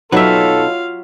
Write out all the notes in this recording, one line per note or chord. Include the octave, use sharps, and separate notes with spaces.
B2 F#3 D#4 F4 A4 B4 E5 F5